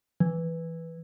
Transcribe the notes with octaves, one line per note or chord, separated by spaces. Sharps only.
E3